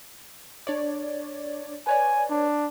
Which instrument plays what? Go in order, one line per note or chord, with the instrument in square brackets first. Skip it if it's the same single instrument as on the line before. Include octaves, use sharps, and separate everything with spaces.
[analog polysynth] D4 C#5 D5
[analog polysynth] B4 C#5 D5 [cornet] G#5
[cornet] D4